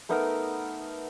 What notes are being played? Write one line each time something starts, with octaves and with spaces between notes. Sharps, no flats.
A3 B3 D#4 A#4